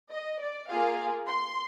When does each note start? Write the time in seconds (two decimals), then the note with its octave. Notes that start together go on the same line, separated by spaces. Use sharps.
0.11 D#5
0.41 D5
0.69 A#3 F4 G#4 F5
1.27 C6